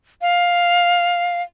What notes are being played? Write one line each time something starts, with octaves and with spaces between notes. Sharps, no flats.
F5